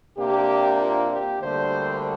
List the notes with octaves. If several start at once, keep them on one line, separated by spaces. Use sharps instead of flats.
C3 A#3 D4 G4
F4
G4
D2 D3 G3 A#3 D4 C5